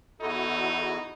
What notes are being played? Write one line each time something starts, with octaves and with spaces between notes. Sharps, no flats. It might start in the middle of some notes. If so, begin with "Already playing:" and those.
E2 D#4 E4 F#4 A4